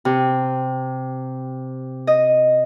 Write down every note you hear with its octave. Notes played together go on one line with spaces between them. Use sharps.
C3
D#5